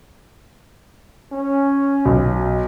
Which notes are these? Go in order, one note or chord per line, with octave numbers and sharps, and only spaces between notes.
C#4
B1